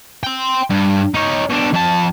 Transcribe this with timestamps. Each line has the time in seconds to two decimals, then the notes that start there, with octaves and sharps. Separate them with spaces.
0.23 G5 C6
0.70 G2
1.14 D#4 C#5
1.50 B2 D4
1.73 F2 A5